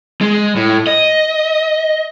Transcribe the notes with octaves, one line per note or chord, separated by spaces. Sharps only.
G#3
A2
D#5